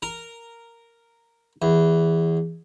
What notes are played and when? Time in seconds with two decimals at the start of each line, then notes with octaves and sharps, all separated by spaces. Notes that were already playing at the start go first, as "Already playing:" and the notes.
0.02 A#4
1.62 E2